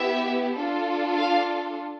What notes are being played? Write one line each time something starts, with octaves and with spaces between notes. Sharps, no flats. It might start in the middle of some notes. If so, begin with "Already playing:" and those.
Already playing: B3 E4 G4 E5
D4 F4 A4
F5